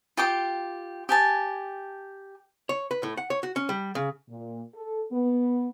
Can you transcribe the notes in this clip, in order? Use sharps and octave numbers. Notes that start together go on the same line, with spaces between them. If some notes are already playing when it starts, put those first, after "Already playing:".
F4 G4 G5 D6
G4 G#5 A5
C#5
B4
A2
F#5
C#5
F#4
C#4
G3
C#3
A#2
A4
B3